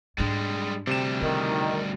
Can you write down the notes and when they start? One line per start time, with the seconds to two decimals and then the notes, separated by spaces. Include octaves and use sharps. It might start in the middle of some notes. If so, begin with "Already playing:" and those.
0.18 G#2 G3 G#3 D4
0.87 D2 C3 G3 E7
1.22 D#3 E4